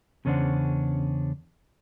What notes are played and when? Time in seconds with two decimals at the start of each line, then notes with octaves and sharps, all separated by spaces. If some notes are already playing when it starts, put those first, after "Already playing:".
0.25 E2 C#3 C#4 D4 C5 F#5